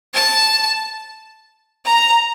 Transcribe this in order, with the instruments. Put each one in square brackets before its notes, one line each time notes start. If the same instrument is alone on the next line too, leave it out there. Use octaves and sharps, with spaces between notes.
[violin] A5
A#5